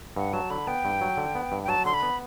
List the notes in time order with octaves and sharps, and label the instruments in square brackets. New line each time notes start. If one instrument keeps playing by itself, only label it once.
[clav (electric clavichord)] G2 [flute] F#5
[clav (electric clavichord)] F#3 [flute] A5
[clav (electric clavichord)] D3 [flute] B5
[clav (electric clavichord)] B3 [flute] G5
[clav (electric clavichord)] G2
F#3
D3
B3
G2
[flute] G5
[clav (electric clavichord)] F#3 [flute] A5
[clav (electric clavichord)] D3 [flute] C6
[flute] B5
[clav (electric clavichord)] B3